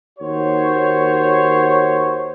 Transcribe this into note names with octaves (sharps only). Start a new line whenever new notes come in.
D#2 F#4 C5 C#5